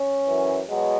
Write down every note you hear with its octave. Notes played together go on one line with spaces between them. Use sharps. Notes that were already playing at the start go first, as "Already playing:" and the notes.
Already playing: C#4
F#2 E3
B2 F#3 G#3